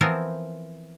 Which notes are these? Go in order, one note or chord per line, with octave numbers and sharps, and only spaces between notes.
E3 F3 B3 C4 E4 A#4